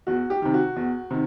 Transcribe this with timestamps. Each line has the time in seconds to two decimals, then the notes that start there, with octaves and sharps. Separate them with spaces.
0.07 E2 F#4
0.30 G4
0.42 C3 D#3
0.54 F#4
0.76 E2
1.10 C3 D#3